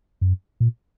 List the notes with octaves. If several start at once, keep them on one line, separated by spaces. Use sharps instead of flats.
F#2
A#2